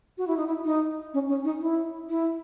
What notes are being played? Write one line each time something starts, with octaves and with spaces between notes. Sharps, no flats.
F#4
E4
D#4
E4
D#4
C#4
C#4
D#4
E4
E4